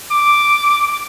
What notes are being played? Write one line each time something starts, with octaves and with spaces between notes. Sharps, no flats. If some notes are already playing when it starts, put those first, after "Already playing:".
D6